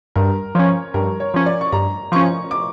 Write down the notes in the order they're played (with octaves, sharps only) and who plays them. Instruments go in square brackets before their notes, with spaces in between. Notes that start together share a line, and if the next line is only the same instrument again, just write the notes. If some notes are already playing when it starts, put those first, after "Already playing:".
[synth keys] G2 [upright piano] A#4
[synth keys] F3 C#4 [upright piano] C#5
[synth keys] G2 [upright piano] A#4
[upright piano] C#5
[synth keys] F3 C#4
[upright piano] D5
C#6
[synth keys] G2 [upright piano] A#5
[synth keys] F3 C#4 [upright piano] C#6
[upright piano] D6